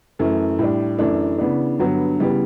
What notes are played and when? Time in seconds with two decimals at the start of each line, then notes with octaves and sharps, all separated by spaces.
0.19 F#2 E3 A3
0.59 A2 G3 D4
0.99 F#2 E3 A3 D4
1.38 C#3 E3 B3 D4
1.79 G2 D3 F#3 B3
2.19 C#3 E3 G3 B3